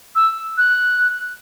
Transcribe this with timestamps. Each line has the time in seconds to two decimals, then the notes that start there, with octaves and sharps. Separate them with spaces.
0.16 E6
0.58 F#6